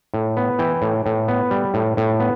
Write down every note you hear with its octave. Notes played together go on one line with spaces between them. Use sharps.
A2
B3
E3 G5
A2
A2
B3
G3
A2
A2
B3